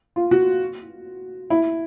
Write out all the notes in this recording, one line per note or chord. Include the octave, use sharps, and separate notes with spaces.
F4
F#4
E4